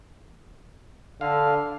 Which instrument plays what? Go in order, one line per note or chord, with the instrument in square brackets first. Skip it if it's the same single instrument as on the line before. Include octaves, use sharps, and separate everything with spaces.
[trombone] D3 [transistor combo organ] F5